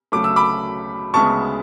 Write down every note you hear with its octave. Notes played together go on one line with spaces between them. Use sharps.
D2 C#3 F#3 A3 D6
E6
B5 D6
D2 C#3 G#3 B3 A5 C#6